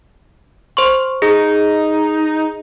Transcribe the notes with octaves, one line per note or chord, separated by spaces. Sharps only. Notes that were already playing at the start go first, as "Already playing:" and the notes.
C5 C6 C#6
D#4 G#4